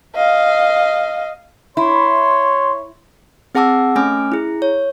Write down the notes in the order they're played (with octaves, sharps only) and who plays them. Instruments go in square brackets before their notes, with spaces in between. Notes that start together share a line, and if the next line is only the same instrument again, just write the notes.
[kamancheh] D#5 F5
[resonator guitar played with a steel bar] E4 [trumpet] C#5 [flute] C6
[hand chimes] C4 G#4 F#5 A5 D6 E6
A3 C#4 G#5 D6 F6
E4 G#4
C#5